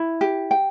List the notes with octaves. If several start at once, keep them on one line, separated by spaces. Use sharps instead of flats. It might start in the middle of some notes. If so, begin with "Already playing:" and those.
Already playing: E4
G4
G5